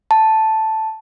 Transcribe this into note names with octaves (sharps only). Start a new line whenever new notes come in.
A5